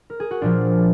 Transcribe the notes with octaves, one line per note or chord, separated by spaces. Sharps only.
A#4
G#4
F#4
A#2 F3 D4 F4